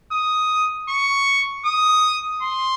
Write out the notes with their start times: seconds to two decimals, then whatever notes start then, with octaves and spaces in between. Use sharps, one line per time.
0.12 D#6
0.89 C#6
1.66 D#6
2.42 C6